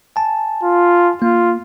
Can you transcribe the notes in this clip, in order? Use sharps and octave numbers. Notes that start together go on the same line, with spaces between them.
G#5 A5
F4
A#3 F4